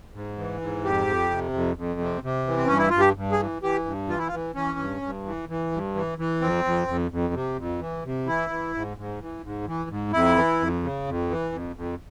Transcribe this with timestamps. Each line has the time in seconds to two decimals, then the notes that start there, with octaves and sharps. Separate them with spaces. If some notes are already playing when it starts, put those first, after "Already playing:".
0.14 G#2
0.38 E3
0.61 G#2
0.84 F2 G4
1.07 F2
1.31 C3
1.53 F2
1.77 F2
2.00 C3
2.23 C3
2.47 E3
2.57 C4
2.67 G2 C#4
2.78 E4
2.90 G2 F4
3.00 G4
3.16 G2
3.32 G#4
3.39 E3
3.62 E3 G4
3.86 G2
4.09 E3 F4
4.18 E4
4.27 F4
4.33 E3
4.55 E3 C#4
4.79 G2
5.02 G2
5.26 E3
5.49 E3
5.72 G2
5.95 E3
6.18 E3
6.41 F2 C4
6.64 F2
6.88 F2
7.11 F2
7.34 C3
7.57 F2
7.80 E3
8.05 C3
8.27 E3 E4
8.50 E3
8.74 G#2
8.97 G#2
9.20 E3
9.44 G#2
9.67 E3
9.90 G#2
10.13 F2 E4
10.36 E3
10.60 F2
10.83 C#3
11.07 F2
11.30 E3
11.52 F2
11.76 F2